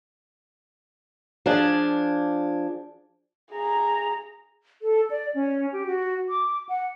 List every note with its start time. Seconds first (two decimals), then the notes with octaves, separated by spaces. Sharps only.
1.46 F3 D4 G#4
3.52 G#4 A#5
4.82 A4
5.10 D5
5.35 C#4
5.72 G4
5.87 F#4
6.29 D6
6.69 F#5